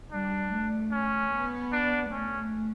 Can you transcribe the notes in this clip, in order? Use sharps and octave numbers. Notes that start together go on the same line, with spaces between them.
G3 D4
A3
C#4
B3
D4
A3 C#4